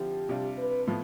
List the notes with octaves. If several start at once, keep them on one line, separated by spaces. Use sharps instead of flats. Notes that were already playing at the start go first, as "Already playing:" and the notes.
Already playing: D3 F3 C4 E4 G4
C3 G3 D4 F4
B4
A2 F3 B3